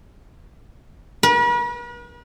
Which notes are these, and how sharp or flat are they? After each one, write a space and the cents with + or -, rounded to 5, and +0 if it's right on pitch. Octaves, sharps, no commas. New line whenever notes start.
B4 -45